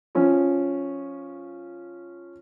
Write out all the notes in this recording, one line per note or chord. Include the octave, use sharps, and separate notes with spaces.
F3 C#4